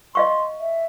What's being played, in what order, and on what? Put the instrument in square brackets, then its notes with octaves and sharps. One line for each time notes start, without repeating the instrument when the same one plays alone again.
[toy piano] D#5 F5 C#6 [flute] C6
[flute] E5